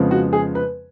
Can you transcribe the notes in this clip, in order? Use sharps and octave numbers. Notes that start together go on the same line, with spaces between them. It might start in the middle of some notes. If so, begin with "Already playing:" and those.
Already playing: F2 C#3 F3 G#3 B3
F#4
G#4
B4